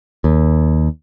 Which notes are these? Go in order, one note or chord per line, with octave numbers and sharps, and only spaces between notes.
D#2